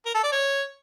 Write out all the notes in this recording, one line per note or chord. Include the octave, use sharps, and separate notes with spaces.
A#4
A4
D5
C#5